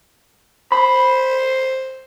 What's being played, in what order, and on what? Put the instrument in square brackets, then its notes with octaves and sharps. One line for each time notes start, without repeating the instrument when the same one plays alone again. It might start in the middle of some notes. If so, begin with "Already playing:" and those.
[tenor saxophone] C5 [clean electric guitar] B5